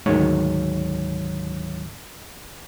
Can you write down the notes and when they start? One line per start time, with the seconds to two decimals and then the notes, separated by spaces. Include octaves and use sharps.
0.06 D2 G#2 D#3 F#3 G#3 C#5